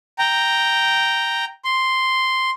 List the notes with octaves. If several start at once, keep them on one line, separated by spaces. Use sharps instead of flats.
G5 A#5
C6